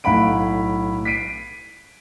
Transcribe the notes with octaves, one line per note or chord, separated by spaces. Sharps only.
B1 A2 F5 F#5 B5 D7
B6 C7 D7 D#7